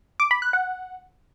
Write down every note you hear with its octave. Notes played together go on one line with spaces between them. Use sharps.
D6
B5
F#6
F#5